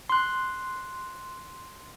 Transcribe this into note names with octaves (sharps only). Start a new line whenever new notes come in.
C6 F#6